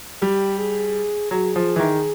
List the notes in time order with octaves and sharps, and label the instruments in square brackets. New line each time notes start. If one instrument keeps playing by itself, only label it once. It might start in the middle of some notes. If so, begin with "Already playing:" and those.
[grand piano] G3 [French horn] G4
[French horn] G#4
[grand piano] F#3 [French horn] G#4
[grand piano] F3
E3
D#3